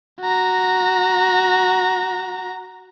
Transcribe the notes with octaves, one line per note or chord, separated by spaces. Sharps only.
F#4 A#5